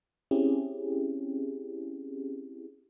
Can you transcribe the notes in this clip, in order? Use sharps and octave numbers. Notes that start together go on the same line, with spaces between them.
C4 C#4 E4 G4 G#4